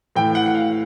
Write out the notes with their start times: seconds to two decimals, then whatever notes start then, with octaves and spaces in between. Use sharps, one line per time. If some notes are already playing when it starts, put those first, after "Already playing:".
0.16 A2 E3 G5
0.35 F#5
0.46 F#5
0.55 F5